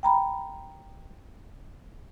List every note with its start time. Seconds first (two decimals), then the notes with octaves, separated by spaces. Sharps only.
0.03 G5 A#5 B5